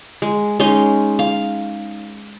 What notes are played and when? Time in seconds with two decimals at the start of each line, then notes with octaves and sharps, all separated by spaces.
0.22 G#3
0.60 G#3 C#4 D#4 C6
1.19 F5